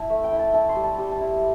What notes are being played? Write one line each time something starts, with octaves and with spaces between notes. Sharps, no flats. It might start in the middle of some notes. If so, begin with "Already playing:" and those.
Already playing: E4 A5
A3 E5
G5
E4
A5
E4 A5
C6
G3
A5
G3 G5
A5
E4